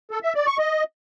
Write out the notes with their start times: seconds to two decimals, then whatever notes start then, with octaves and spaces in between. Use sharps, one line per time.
0.11 A4
0.23 E5
0.35 D5
0.47 C#6
0.58 D#5